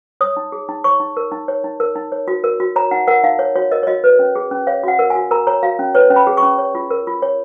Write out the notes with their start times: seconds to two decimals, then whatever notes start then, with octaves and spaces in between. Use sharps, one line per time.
0.21 C#5 D#6
0.37 D#4
0.52 G#4
0.69 D#4
0.84 C#5 C#6
1.00 D#4
1.17 A#4
1.32 D#4
1.48 C#5
1.64 D#4
1.80 A#4
1.96 D#4
2.12 C#5
2.28 F#4
2.44 A#4
2.60 F#4
2.76 C#5 A#5
2.91 D#4 F#5
3.08 A#4 F#5
3.24 D#4 F5
3.39 C#5
3.56 F#4 C#5
3.71 A#4 D#5
3.83 C#5
3.87 F#4 D#5
4.04 B4
4.19 C#4
4.35 G#4
4.51 C#4
4.67 C#5 F5
4.83 F#4 F#5
4.99 A#4
5.10 G#5
5.15 F#4
5.31 A#4 A#5
5.47 C#5 A#5
5.63 F#4 F5
5.79 C#4
5.95 B4 C#5
6.10 C#4
6.16 B5
6.27 G#4
6.37 C#6
6.42 C#4
6.58 C#5
6.75 F4
6.91 A#4
7.07 F4
7.22 C#5